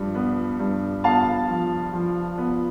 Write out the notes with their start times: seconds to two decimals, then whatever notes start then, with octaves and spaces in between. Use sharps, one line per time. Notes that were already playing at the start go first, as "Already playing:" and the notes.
Already playing: G2 F3
0.15 B3
0.59 G2
1.04 B3 F5 A5
1.49 F3
1.93 F3
2.38 B3